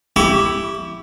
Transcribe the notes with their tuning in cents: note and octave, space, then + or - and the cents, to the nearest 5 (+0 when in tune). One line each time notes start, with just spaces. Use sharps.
E4 +0 G4 +0 C#6 +40